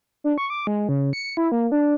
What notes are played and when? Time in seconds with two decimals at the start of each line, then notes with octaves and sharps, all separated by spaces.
0.24 D4
0.38 C#6
0.50 D6
0.67 G#3
0.89 C#3
1.13 C#7
1.37 E4
1.52 A#3
1.72 D4